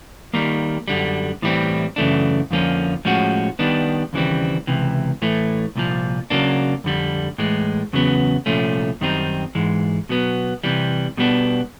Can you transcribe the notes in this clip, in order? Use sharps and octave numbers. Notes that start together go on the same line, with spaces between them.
D#3 G3 A#3
F#2 D3 G3
A2 E3 G3 C4
F#2 C#3 E3 A3 D4
F2 D3 F3 A#3 C#4
A2 F3 G#3 C#4 F#4
D#3 G3 B3 D4
D#2 C#3 E3 G3 C4
C#2 C3 E3
A2 E3 A3
C2 A#2 F3
C#3 F#3 A#3 D4
F2 D3 G3
A2 E3 G#3
E2 C#3 F#3 B3
C2 A#2 F3 A3 C#4
F#2 D#3 G3 C4 D#4
G#2 E3 G#3
B2 F#3 B3
C3 E3 G3
B2 G3 B3 D4